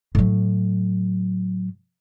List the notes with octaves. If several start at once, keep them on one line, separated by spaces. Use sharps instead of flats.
A2 F#3